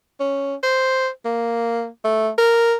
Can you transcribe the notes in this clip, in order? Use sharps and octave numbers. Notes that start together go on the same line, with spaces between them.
C#4
C5
A#3
A3
A#4